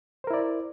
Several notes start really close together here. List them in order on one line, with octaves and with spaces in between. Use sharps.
C5 A#4 E4 D5